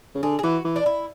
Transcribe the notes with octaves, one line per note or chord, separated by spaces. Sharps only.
C#3
D3 G#4
G#4
E3 F#4
E3
D4
E4